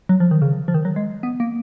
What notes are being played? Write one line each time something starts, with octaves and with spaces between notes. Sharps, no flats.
F#3
F3
D#3
C#3
F3
D#3
F#3
G#3
B3
A#3